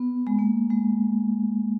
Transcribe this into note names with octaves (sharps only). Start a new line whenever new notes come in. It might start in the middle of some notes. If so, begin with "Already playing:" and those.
Already playing: B3
G#3
A#3
G#3